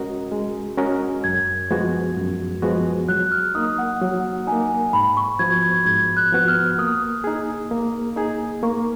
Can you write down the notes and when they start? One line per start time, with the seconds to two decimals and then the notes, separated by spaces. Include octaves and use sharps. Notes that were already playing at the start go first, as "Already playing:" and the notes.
Already playing: G#3 C#4 F#4 A#4 D#5
0.32 G#3
0.78 C#4 F#4 A#4 D#5
1.24 F#2 G#6
1.71 F3 G#3 B3 F#4
2.17 F#2
2.62 F3 G#3 B3 F#4
3.08 F#3 F#6
3.32 F6
3.55 A#3 D#4 D#6
3.78 F#5
4.01 F#3 F#5
4.47 A#3 D#4 G#5
4.93 G#2 B5
5.17 C#6
5.39 F3 B3 F#4 G#6
5.63 G#6
5.86 G#2 G#6
6.17 F#6
6.32 F3 B3 F#4
6.48 F6
6.79 A#3 D#6
7.24 D#4 G#4
7.71 A#3
8.16 D#4 G#4
8.63 A#3 C#6